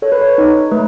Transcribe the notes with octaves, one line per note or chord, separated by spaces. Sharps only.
A4 C#5
B4
C#5
D#4
A3 B4